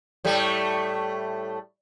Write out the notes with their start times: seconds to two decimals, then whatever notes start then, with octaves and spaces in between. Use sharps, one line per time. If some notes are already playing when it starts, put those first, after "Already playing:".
0.25 A2 G3 A3